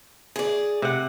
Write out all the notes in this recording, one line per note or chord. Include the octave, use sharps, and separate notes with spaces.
G#4 D5
C3 F#5